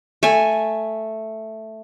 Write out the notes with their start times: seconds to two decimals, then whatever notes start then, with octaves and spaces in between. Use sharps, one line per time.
0.23 A3 G#5